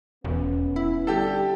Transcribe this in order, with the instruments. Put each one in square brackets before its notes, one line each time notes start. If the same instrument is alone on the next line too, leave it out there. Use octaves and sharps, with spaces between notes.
[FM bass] E1 [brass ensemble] B3 C#4
[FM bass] E4
[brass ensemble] D3 G3 [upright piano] G4 A4